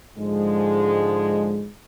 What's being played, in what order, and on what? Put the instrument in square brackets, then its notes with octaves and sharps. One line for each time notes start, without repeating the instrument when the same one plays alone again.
[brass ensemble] G#2 D3 F3 G#3